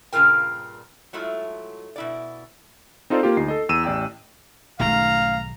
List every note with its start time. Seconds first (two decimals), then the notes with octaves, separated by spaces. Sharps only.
0.13 G2 A#2 C#3 F4 A#4 G5
1.13 F#3 G#3 A3 E4 F4
1.96 B2 E4 D5
3.10 C4 D#4 F4 A4 C5 D5
3.23 A#3 F4 G4
3.37 D2 D#4 C7
3.48 A4 D#5
3.69 E2 E6 D#7 E7
3.84 A1 D5 G5 E6
4.80 B1 G#2 D#3 A3 C#4 F5 A#5